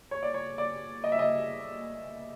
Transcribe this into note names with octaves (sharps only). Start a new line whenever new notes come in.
C#5
D5
C#5
D5
D#5
E5
D#5